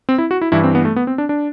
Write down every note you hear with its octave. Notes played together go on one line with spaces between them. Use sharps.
C4
E4
F#4
E4
G2 E3 E4
C4
B3
A3
B3
C4
D4
D4